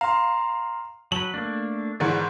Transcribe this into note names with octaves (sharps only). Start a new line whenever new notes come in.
F5 A#5 C6
F#3 B4 A5 F#7
A3 A#3 D4
G#2 D#3 E3 D5 F#5 B5